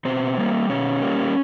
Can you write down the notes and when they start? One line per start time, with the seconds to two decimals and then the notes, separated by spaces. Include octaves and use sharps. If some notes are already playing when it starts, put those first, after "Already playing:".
0.05 B2 C4 C5
0.38 G3 A#3
0.69 B2 C#4 C#5
1.01 G3 A#3